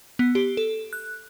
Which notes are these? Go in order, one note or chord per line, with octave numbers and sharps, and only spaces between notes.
B3
G4
A4
F#6